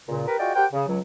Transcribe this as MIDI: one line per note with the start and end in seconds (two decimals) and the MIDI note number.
0.08 0.26 37
0.08 0.26 46
0.08 0.26 49
0.27 0.38 67
0.27 0.38 70
0.27 0.38 71
0.39 0.51 65
0.39 0.51 66
0.39 0.51 68
0.39 0.51 74
0.39 0.51 75
0.39 0.51 79
0.55 0.66 67
0.55 0.66 70
0.55 0.66 72
0.55 0.66 78
0.55 0.66 79
0.73 0.86 49
0.88 0.99 37
0.88 0.99 54